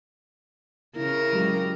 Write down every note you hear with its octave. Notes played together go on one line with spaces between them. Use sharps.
C#3 E4 A#4
F#3 G#3 G4